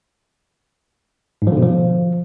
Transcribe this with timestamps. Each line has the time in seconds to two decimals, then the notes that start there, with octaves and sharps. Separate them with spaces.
1.42 G#2
1.47 F3
1.52 D3
1.57 B2
1.62 F3